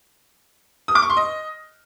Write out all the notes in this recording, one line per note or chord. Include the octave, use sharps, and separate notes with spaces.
D#6
D6
C#6
C6
D#5